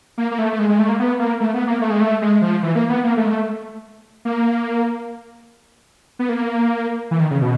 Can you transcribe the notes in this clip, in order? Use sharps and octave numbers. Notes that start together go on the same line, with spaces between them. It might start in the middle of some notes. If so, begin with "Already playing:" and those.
A#3
A#3
A3
A3
G#3
G#3
A3
A#3
B3
A#3
A3
B3
A#3
A3
G#3
A3
G#3
F3
E3
A#3
B3
A#3
A3
G#3
A3
A#3
B3
A#3
E3
D#3
C#3
B2